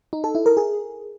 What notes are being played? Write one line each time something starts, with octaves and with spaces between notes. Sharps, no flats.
D#4
A4
E4
A#4
G#4